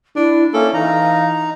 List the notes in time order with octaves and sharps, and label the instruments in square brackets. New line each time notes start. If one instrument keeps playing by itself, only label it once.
[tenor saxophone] D4 [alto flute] E4
[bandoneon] A#3 C#4 [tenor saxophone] A4 [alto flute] E5
[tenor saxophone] E3 [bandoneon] D#4 A#5 [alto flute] F5